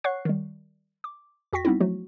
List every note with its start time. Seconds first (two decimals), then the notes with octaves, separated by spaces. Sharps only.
0.04 C#5 F#5 C#6 F#6 C7
0.25 D#3 G3
1.04 D6
1.53 F2 F#4 G5 C#6 A#6 B6
1.65 G3 B3 C4 D#4 E4
1.81 F3 F#3 A3 F#4